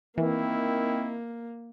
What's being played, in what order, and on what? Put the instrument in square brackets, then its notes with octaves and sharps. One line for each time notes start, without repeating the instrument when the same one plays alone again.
[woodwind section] D#3 C4 [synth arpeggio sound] E3 [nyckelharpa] A#3 [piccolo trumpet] E4